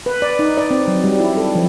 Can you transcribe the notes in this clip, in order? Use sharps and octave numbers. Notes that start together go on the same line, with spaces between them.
B4
D5
D#4
D5
C4
F#3
G3
E4
A4
F3